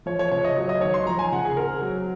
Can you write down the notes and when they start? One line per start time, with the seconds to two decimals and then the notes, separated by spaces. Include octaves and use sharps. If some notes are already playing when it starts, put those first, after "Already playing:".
0.06 F3 C#5
0.19 C#5
0.31 C#3 C#5
0.45 D#5
0.57 F#3
0.69 D#5
0.81 D#3 C#5
0.94 C6
1.07 F3 A#5
1.19 G#5
1.32 C#3 F#5
1.45 G#4
1.57 C4 A#4
1.82 F#3